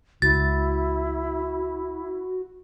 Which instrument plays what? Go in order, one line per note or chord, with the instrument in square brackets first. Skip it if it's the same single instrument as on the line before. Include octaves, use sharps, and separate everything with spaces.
[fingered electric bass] C#2 [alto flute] E4 [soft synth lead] F#4 [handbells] A6